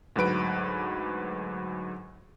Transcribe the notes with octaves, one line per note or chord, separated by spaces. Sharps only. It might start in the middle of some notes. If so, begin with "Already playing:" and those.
D2 G#2 F#3 B4 D7